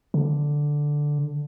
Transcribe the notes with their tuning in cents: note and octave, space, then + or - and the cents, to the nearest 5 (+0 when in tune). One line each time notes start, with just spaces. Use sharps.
D3 +0